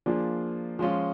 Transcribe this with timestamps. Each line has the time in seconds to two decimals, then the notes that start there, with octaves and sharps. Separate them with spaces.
0.06 F3 A#3 D4 F4 G#4
0.79 F3 G#3 C#4 F4